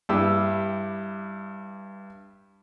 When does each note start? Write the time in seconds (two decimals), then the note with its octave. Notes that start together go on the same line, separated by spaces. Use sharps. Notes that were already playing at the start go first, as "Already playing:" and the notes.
0.09 G2 E4 G4 E6